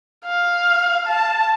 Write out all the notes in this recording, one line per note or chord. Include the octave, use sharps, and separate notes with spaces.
F5
A5